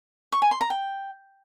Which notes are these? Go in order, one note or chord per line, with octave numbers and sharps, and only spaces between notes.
C#6
G#5
C6
A#5
G5